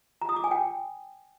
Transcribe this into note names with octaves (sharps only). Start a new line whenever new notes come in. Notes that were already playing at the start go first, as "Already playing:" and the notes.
A#5
D#6
D6
G#5
G5